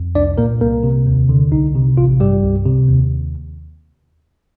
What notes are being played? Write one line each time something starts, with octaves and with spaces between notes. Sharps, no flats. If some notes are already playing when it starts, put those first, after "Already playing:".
Already playing: F2
C2 D4 D5
A#2 A#3 A#4
C2 A#3 A#4
C3
D#2
D3
C2 D#4
C3
A1 F4
G2 G3 G4
C2
C3
D#2